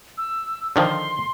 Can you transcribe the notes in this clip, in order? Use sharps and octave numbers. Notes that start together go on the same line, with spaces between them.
E6
D3 D#3 F3 C6